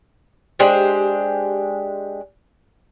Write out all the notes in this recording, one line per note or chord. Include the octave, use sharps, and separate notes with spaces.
G#3 D4 G4 C5